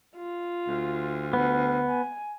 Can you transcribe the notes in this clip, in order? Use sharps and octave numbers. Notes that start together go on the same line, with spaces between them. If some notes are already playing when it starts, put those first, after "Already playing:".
F4
D2
B3
G#5